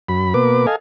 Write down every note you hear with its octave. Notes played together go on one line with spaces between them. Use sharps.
F#2 B5
B2 A#3 B4 D6
A4 D#5 F5 G#5